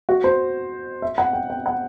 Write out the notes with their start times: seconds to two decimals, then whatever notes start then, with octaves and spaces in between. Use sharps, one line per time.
0.09 F#4
0.24 C5
1.02 E5
1.18 F#5
1.33 G5
1.50 G5
1.66 F#5